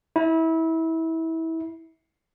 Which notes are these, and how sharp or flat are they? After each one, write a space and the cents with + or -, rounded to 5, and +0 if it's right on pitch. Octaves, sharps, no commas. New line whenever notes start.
E4 -25